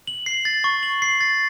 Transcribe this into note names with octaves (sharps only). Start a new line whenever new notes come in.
F#7
C7
A6
C#6
F#7
C7
A6